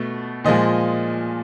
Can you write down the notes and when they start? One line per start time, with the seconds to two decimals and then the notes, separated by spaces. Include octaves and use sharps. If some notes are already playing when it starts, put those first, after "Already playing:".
Already playing: B2 A3
0.44 A#2 F3 G#3 D#5